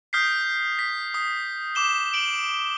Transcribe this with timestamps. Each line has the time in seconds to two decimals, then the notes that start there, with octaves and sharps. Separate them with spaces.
0.13 D#6 F6 G6 B6 C7
0.79 B6
1.14 D#6
1.75 D6 E7 G7
2.14 D7 F#7 G7